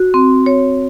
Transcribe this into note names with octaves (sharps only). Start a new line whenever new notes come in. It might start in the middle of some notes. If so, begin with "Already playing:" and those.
Already playing: F#4
C4
C#5